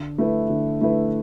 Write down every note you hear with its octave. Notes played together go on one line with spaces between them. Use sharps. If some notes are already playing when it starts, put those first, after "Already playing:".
Already playing: D3
A3 E4 B4
D3
A3 E4 B4